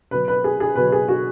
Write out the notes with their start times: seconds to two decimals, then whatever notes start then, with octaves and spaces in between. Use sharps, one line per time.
0.11 B2 F#3 B4
0.28 B4
0.44 G#4
0.60 G#4
0.76 B2 F#3 B4
0.92 G#4
1.08 F#4